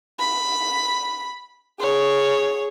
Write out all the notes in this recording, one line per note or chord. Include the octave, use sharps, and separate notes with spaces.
B5
G#4 C#5